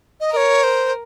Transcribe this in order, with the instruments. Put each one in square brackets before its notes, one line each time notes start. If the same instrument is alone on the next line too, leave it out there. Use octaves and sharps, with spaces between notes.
[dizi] D#5
[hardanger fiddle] A#4 [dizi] D#5
[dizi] C#5
C5